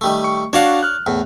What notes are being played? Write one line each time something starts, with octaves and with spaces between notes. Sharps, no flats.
D#3 G3 A3
C#6
D4 F#4 C#5 D5 F5 A5
F6 F#6
E2 A2